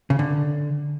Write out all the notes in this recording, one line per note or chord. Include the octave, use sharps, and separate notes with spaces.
C#3
D3